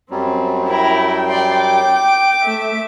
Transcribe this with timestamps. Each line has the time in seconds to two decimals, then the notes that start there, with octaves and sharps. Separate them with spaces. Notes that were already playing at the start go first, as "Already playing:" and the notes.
0.11 F#2 F#3 G3 C4
0.68 E4 A#4 G5
1.28 D5 C6
1.58 D6
2.44 A3 E5